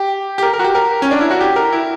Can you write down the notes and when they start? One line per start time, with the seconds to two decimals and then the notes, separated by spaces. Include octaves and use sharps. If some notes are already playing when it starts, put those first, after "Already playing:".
Already playing: G4
0.38 G4
0.43 A#4
0.53 A#4
0.59 F#4
0.64 G4
0.75 A#4
1.02 C#4
1.11 D4
1.21 E4
1.31 F#4
1.41 G4
1.56 A#4
1.72 E4